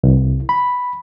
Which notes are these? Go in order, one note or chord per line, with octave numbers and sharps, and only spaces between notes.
C2
B5